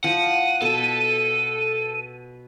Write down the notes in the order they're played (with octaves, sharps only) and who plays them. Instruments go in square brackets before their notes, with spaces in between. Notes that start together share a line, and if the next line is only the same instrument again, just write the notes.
[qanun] F3 [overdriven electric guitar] F#5 [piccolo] D#7
[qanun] B2 [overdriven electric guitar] A4